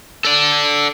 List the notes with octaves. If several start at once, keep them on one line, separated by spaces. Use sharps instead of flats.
A4 D5